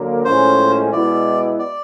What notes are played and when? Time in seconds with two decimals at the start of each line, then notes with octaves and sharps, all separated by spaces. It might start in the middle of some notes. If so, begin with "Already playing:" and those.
Already playing: D3 F#3 A#3
0.25 A2 F3 G#3 C#4 C5
0.92 B2 G#3 B3 E4 D5
1.59 D5